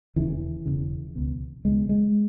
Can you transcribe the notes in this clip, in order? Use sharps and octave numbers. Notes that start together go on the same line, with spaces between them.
E1 D#2 C#3 E3
E1 D#2 C#3
C#2 B2
C#2 B2 G#3
G#3